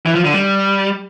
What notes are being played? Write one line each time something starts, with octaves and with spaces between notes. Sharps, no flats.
E3
F3
D3
G3